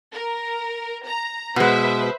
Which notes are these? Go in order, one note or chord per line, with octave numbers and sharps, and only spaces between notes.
A#4
A#5
B2 G#3 B4 C5 E5